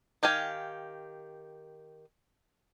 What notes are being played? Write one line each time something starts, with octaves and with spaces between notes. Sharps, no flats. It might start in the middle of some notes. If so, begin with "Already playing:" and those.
D#3 G4 F5 G#5